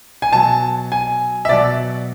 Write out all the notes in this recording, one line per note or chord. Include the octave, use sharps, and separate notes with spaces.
G#5
B2 F#3 A5
G#5
E5
B2 F#3 D5